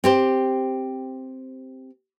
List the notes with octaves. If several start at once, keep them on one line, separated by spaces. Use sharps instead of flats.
C4 G4 C5